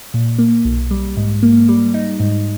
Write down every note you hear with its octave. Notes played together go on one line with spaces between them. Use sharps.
A#2
A#3
B1
G3
G#2
A#3
G3
D#4
G#2